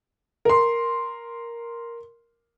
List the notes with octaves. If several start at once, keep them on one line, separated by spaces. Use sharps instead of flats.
A#4 C6